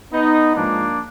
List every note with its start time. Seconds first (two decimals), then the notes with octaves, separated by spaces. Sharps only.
0.13 B3 D#4
0.55 G#2 F3 G#3 A#3 D4